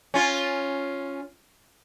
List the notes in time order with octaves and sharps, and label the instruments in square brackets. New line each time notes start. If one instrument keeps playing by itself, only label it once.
[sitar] C#4 F4